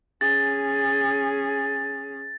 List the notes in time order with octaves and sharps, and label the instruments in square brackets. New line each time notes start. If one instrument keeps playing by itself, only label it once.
[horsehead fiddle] C#4 G#4 [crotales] A6